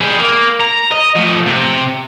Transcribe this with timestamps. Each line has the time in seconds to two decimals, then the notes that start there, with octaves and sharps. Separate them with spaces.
0.01 G3 G#4
0.19 A#3
0.60 A#5
0.91 D#5
1.15 F3 A3
1.47 C3